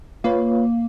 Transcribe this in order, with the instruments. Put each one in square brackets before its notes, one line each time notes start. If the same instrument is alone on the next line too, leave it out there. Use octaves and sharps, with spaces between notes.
[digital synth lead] A#3 [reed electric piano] F4 B4 C#5